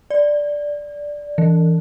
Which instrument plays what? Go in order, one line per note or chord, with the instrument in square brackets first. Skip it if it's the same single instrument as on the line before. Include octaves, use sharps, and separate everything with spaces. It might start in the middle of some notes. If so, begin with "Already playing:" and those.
[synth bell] D5
E3